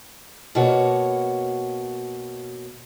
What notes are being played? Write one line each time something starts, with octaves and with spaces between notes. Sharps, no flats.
B2 A#3 F#4 C#5